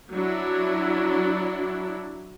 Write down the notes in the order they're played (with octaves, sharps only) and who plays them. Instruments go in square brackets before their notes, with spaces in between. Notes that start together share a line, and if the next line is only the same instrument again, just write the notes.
[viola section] F#3 D4 E4